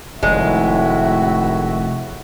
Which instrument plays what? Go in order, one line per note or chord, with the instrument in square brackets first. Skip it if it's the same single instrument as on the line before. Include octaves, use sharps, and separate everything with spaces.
[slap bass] F1 [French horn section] A2 D#3 [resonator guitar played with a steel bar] G#3 [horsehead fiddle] F#4 E5